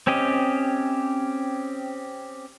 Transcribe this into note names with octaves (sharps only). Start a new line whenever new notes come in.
C4 C#4 G4 D#5